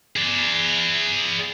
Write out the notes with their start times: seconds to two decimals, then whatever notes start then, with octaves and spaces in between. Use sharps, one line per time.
0.16 G#4 D5